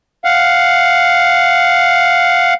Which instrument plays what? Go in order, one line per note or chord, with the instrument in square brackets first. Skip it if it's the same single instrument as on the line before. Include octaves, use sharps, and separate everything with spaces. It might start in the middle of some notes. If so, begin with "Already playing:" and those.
[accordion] F5 F#5